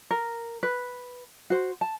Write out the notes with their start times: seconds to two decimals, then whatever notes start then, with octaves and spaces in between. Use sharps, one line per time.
0.11 A#4
0.63 B4
1.50 F#4 C5
1.81 A5